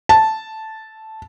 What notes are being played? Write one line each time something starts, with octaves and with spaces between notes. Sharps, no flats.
A5